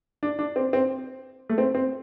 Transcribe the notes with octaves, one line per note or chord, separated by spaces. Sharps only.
D4
D4
C4
C4
A3
C4
C4